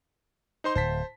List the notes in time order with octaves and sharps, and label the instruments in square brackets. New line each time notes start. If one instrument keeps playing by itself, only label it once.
[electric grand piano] D#4 C5 C6
[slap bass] D1 [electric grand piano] C5 A5 B6